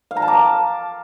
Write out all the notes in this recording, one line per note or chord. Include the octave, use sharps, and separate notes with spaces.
F5
A#5
A5
D6
A5